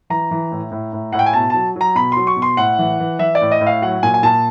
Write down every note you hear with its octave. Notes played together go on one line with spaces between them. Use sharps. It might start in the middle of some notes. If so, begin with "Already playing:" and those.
E3 A#5
E3
A2
A2
A2
A2 F#5
G5
G#5
B2 A5
F#3 A5
F#3 A#5
B2 B5
F#3 C6
C#6
B2
C6
A2 F#5
E3
E3
E3 E5
D5
A2
D#5
A2
F5
F#3 F#5
A#2 G#5
G#5
A#2 A5